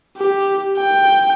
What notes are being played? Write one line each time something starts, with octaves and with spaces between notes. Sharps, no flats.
G4
G5